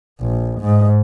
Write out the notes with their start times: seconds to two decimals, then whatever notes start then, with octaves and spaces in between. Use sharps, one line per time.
0.21 A#1
0.61 G#2